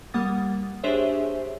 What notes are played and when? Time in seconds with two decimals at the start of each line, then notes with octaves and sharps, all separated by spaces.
0.14 G3 A#3 F#5 D#6 A6
0.83 D4 G4 G#4 C5 C#5 E5